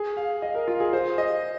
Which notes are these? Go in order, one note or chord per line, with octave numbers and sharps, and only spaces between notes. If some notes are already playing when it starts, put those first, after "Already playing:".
Already playing: G#4
F5
D#5
A#4
F4
G#4
C5
D#5